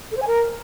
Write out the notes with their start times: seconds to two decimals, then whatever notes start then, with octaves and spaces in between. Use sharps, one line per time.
0.12 A4
0.17 C5
0.22 G#5
0.27 A#4